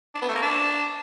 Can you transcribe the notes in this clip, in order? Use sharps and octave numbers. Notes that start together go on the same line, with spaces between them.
D4
B3
A3
A#3
D4